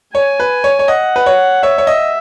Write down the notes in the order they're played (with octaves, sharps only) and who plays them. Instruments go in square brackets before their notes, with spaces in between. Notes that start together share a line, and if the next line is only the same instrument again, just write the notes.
[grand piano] C#5 [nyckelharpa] G#5
[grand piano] B4
C#5
C#5
[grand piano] D#5 [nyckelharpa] F#5
[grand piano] B4
C#5
[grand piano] C#5 [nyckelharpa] E5
[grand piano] C#5
D#5